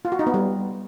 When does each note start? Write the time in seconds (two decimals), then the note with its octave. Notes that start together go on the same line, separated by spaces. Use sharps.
0.05 F4
0.12 F#4
0.19 D#4
0.27 B3
0.34 G3